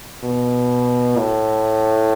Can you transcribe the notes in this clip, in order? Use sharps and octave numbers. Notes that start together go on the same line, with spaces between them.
B2
A2